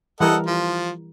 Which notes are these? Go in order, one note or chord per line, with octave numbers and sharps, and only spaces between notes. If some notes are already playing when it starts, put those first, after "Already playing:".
E3 G3 A4 A#4 D#5 F#5
F3